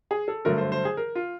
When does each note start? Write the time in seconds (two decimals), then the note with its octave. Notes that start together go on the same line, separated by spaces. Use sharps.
0.11 G#4
0.28 A4
0.45 G2 D3 F#3 A3 A#4
0.58 C5
0.72 C5
0.85 G#4
0.97 A#4
1.15 F4